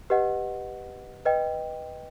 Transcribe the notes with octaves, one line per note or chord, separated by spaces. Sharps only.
G4 B4 D#5 F#5
B4 D#5 G5